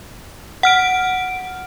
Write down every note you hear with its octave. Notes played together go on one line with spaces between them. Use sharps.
F#5 F6 D7